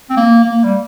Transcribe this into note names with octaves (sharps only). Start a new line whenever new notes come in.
C4
A#3
A#3
G3